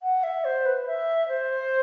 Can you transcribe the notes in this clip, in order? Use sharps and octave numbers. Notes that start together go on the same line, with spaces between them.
F#5
E5
C5
B4
E5
C5